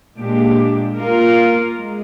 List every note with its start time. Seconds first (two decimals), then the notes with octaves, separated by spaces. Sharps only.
0.17 A#2 G#3 D4 G4
0.95 A#3 F4 A#4
1.73 G#3